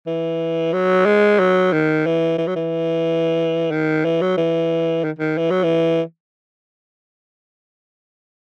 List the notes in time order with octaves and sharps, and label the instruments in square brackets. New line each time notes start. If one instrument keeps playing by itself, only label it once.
[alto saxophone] E3
F#3
G#3
F#3
D#3
E3
E3
F#3
E3
D#3
E3
F#3
E3
D#3
D#3
E3
F#3
E3